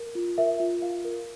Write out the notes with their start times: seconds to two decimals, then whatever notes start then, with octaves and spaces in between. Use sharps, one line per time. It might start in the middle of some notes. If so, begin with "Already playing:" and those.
Already playing: A#4
0.15 F4
0.38 A#4 E5
0.60 F4
0.82 F4 F5
1.05 A#4